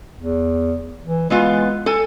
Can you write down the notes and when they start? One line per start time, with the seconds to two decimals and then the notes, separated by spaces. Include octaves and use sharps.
0.18 E2
1.04 E3
1.30 E3 G#3 B3 F4
1.86 A4 G#5